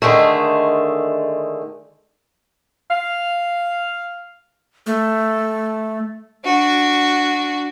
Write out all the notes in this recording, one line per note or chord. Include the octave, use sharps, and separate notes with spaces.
D3 D#3 G#3 A3
F5
A3
D4 F#4